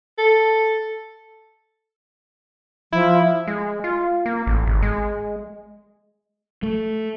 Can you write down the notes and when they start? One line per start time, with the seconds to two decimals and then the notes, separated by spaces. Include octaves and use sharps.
0.18 A4
2.92 F3 E4
3.47 G#3
3.84 F4
4.26 A#3
4.47 A1
4.66 G#1
4.83 G#3
6.63 A3